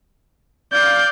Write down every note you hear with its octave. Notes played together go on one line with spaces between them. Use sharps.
D5 F5 G6